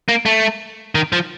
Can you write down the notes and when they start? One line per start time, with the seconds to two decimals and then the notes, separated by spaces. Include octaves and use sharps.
0.08 A#3
0.26 A3
0.95 D#3
1.13 F3